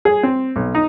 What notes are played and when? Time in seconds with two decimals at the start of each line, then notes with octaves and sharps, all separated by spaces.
0.05 G#4
0.23 C4
0.56 B1
0.75 D#4